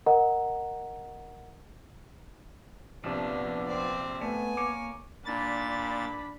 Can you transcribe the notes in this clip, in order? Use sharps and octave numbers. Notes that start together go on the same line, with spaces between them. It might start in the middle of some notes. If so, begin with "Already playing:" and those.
A#4 D#5 F#5 A#5
A#1 C3 F3 B3 D4
C4 D5
A3 B3 G#5
A#3 C#5 D6
A#2 D4 B5 A6